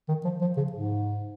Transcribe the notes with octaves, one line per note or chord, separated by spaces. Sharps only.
D#3
F3
F3
C#3
G#2